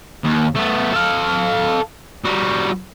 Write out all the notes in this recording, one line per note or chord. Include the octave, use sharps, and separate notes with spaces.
D#2
A3 B3
A4 F5
G3 F#4